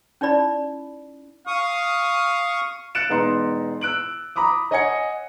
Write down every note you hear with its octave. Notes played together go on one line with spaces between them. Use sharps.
C#4 D#4 E4 D5 B5
F5 C#6 D#6
F#6 A6 C#7 D7 E7
E1 B3 D#4 A#5 C6 F#6
E6 F#6 D7 F#7
A#5 B5 D6 D#6
C#5 D#5 F#5 G#5 G#6 C#7